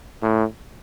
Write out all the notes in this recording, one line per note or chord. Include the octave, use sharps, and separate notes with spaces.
A2